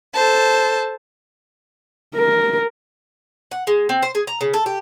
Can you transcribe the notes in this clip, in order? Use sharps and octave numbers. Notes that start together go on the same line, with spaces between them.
A4 C5 A5
A#4
F#5
G#3
C4
C5
G#4
A#5
C#3
A4
G4